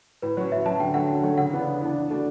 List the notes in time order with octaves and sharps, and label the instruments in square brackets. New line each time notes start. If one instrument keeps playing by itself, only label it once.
[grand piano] A2 [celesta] B4
[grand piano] F#3 C#4
[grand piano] A2 [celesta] E5
[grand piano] F#3 C#4 [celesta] A5
[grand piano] D3 [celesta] G5
[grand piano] F#3 A3 C#4 [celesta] F#5
[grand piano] D3
F#3 A3 C#4
[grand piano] C#3 [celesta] F#5
[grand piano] E3 B3 D4
C#3
E3 B3 D4
E3
A3 D4 F#4